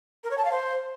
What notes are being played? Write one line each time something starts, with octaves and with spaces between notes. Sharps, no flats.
A#4
C#5
A5
F5
C5